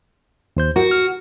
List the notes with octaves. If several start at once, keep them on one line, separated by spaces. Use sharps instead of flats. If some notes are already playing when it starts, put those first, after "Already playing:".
D#2 C5 G6
F#4 A#4
F6